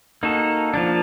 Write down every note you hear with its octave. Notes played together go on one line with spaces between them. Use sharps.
A#3 D#4 F#4 A4
F3 A#3 D4